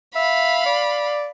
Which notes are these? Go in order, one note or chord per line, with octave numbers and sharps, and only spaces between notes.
E5 F5 B5
D5